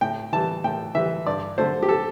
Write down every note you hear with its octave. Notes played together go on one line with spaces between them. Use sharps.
A2 G5
E3 G3 A5
A2 G5
E3 G3 E5
G2 D5
D3 A3 C4 C5
G4
A4